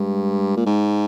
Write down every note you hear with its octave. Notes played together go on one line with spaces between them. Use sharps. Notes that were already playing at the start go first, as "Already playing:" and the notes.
Already playing: G2 G#3
A#2
G#2